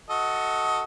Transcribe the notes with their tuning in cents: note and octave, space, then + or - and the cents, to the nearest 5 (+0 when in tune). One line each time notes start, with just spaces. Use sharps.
F#4 +0 A4 +0 D#5 +20